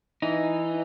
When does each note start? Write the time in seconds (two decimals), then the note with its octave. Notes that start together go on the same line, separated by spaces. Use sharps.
0.22 E3 D#4